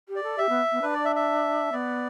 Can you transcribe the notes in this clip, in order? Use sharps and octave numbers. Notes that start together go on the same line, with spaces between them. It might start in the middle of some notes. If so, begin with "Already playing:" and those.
G4
D5
A4
G4 E5
B3
B3
D4 B4
D5
E5
E5
B3 D5